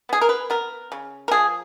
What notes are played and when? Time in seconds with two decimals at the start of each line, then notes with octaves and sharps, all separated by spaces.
0.09 B3 G#4
0.21 A#4
0.29 B4
0.50 B3 A#4
0.92 C#3
1.28 A#4
1.31 F3 G#4